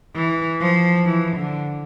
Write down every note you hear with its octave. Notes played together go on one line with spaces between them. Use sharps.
E3
F3
E3
D3